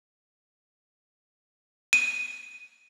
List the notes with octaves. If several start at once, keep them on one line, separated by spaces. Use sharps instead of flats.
D#7